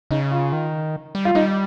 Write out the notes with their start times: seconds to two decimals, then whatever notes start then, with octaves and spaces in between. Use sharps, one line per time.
0.11 C#3 D#4
0.31 F4
0.53 D#3
1.15 G3
1.25 F4
1.35 G3 D#4